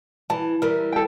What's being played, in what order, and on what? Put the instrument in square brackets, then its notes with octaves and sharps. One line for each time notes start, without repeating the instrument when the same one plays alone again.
[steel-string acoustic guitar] E3 [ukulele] A5
[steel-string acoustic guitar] E3 G3 [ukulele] A#4
[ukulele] A4 G5